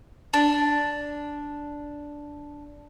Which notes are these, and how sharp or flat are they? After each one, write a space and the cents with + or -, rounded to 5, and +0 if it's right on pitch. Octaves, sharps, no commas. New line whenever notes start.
D4 -5